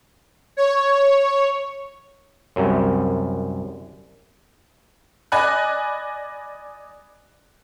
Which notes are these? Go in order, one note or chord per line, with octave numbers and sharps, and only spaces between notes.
C#5
C2 F#2
D5 D#5 G#5 B5 F#6